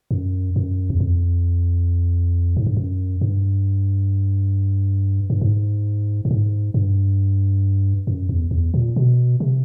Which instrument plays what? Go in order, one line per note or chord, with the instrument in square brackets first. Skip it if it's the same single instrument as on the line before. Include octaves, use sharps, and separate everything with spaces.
[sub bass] F#2
F#2
E2
F2
G#2
G2
F#2
G2
G2
G#2
G2
G#2
G2
F#2
E2
E2
A#2
B2
C3